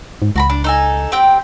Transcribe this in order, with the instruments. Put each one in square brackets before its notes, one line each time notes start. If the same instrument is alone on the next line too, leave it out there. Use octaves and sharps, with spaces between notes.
[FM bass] G#2
[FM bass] C#2 [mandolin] F#4 A#5 B5
[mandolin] D4
D#4 A4 G#5
C4 G4 G5